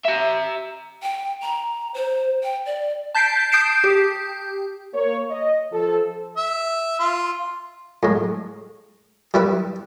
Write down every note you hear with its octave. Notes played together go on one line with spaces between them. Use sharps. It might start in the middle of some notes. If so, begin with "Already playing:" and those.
E5 A#5
G5
A#5
C5
G5
D5
A5 G6 B6 C7 D7
D#6 G6 C7 D7 E7
G4
A#3 C#5
D#5
F3 A4
E5
F4
A2 G#3
G3 E4 B4